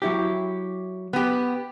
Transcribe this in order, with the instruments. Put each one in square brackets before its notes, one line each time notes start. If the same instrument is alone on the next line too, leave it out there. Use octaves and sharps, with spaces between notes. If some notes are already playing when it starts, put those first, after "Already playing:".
[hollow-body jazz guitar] F#3 E4 G4
[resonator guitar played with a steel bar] B3 G4